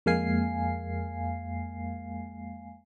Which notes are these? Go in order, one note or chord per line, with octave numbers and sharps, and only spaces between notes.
F2 G#3 A#3 F5 G#5 C7